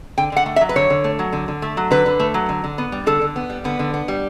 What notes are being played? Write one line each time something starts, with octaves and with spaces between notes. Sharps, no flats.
D3 G5
D3 F#5
A3
E5
F#3
B4
D3 C#5
D3
A3
F#3
D3
D3
A3
F#3
D3 B4
D3
A3
F#3
D3
D3
B3
G3
D3 A4
D3
B3
G3
D3 B3
D3
B3
G3